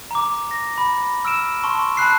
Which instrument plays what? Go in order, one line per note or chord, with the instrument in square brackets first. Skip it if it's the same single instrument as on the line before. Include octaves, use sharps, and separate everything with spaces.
[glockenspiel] A#5 D6
A#6
B5
E6 F6 D7 E7
A5 C6 C#6
A5 B5 F#6 C7